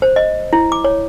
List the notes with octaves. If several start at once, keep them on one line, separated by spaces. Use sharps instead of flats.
C5
D#5
E4
D6
C#5